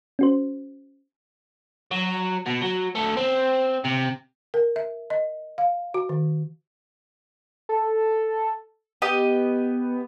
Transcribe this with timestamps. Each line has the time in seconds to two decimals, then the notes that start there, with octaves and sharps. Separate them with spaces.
0.19 C#4 F#4 C5
1.91 F#3
2.46 B2
2.62 F#3
2.95 D2 A3
3.17 C4
3.84 C3
4.54 A#4
4.76 E5
5.10 D#5
5.58 F5
5.94 F#4
6.09 D#3
7.69 A4
9.02 B3 G4 D#5